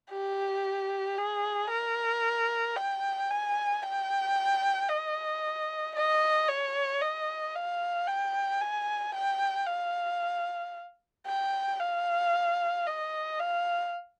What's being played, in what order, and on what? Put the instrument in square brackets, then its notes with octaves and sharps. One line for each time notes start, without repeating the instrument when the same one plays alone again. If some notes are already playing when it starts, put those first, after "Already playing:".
[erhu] G4
G#4
A#4
G5
G#5
G5
D#5
D#5
C#5
D#5
F5
G5
G#5
G5
F5
G5
F5
D#5
F5